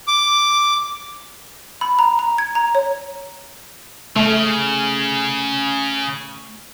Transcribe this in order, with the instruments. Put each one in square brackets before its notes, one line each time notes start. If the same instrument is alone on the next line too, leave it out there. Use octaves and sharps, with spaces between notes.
[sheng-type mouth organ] D6
[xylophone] B5
A#5
A#5
G#6
A#5
C#5
[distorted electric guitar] C#3 [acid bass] A3